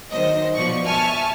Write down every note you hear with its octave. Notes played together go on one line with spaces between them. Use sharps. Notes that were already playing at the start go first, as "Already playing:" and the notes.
D#3 F#3 C5 D#5
B2 F3 D5 C#6
E5 G#5 A5 C#6 F6